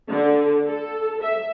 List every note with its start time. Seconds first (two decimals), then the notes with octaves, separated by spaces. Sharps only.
0.10 D3
0.67 A4
1.23 E5